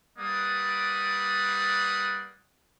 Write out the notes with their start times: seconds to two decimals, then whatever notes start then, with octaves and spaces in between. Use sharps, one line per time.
0.19 G3 A#3 B4 D5 F#5 D#6